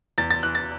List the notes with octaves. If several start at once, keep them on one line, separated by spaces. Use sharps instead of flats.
E2 A6
A6
E3 F#6
A6